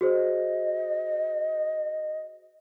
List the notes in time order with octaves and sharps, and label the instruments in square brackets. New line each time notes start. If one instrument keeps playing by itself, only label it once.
[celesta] F#4 G#4 C5 [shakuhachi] D#5